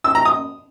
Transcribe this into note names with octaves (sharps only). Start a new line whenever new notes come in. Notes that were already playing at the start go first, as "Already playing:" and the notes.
E6
A#5
D#6